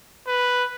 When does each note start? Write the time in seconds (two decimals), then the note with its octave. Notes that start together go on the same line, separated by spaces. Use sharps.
0.27 B4